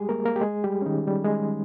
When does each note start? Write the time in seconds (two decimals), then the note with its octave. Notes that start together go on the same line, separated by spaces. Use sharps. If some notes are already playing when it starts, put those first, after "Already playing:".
Already playing: G3 G#3 G4 G#4
0.09 A#3 A#4
0.25 A#3 A#4
0.36 G4
0.41 G#3 G#4
0.64 G3 G4
0.82 C#4
0.86 D#3 D#4
1.07 G3
1.24 G#3